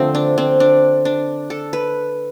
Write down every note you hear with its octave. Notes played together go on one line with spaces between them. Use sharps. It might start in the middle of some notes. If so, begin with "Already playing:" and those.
Already playing: D3 F3 A3 C4
D4
C4
D4
D4
A4
B4